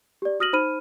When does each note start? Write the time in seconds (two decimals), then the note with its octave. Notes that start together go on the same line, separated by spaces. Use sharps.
0.22 G4 D5
0.40 F#4 D#6 F6 A#6 D#7 F#7
0.53 D#4 C5 B5 F6 D#7